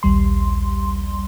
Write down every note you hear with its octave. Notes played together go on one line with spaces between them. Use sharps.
A#1 D#2 G3 C6